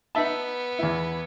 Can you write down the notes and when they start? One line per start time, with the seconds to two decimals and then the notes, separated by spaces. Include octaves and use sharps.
0.15 B3 D#4 E5 A5
0.79 E2 E4